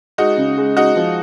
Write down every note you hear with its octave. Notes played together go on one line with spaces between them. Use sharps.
G#3 D#4 F#4
C#3
G#3
G#3 D#4 F#4
F3